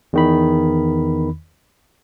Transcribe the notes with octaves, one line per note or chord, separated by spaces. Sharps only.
E2 D#3 B5